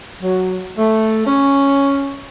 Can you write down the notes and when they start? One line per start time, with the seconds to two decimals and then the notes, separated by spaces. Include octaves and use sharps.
0.22 F#3
0.78 A3
1.27 C#4